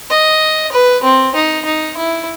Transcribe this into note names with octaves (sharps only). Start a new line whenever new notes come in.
D#5
B4
C4
D#4
D#4
E4